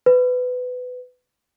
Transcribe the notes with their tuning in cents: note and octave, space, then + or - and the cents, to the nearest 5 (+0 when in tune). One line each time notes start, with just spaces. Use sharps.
B4 +20